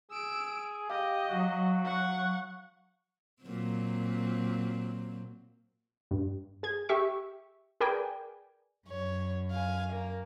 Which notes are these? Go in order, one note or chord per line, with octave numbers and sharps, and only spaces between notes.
G#4 E6 D7
G4 D#5 F5
F#3 F#4
F#5 C#6
A#2 F#3 C4
G2
G#4 G#6
G4 E5 C#6
G#4 A#4 B4 D5 G5 G#5
F#2 C#5
F5 G#5
A#3